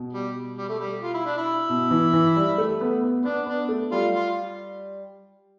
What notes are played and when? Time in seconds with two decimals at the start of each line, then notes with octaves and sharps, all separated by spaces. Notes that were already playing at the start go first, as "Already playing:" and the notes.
Already playing: B2
0.13 G3
0.58 G3
0.69 A3
0.80 G3
1.02 F4
1.14 E4
1.26 D4
1.38 E4
1.69 B2
1.91 E3
2.13 E3
2.36 G3
2.58 A3
2.81 B3
3.03 B3
3.25 B3 D4
3.47 B3 D4
3.69 A3
3.91 G3 F4
4.14 F4